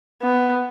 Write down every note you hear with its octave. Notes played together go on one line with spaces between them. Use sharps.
B3